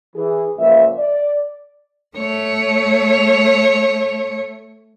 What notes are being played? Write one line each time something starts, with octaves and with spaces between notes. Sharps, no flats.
E3 G#4
C#2 A#2 F3 E5
D5
A3 C#5